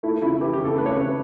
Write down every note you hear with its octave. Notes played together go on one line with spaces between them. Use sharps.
A3 E4
C#3 E4
E3 G4
G4
C#3
A4
A3 B4
C#5
C#3 B4